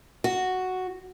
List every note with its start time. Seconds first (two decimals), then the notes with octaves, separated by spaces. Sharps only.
0.24 F#4